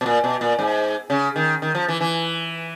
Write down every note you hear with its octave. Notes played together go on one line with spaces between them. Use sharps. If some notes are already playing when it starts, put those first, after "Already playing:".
B2
A#2
B2
A#2
G#2
C#3
D#3
D#3
F3
E3
E3